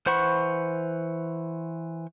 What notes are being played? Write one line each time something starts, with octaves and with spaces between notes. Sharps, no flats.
E3 C5 F#5 B5 C#6